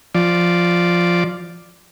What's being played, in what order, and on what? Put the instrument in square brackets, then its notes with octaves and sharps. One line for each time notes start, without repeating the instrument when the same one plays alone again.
[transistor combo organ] F3 D5